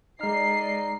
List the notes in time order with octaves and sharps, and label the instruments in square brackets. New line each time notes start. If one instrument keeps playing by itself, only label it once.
[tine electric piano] G#3 F6 [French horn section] D#4 D5 [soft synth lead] A#5 [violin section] C7